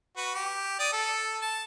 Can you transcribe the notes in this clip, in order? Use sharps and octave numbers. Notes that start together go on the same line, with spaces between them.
F#4 B4
G4
D5 D#6
A4
A5